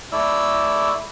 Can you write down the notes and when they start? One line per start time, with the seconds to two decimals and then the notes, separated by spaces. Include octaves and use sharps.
0.12 A3 E4 D5 E6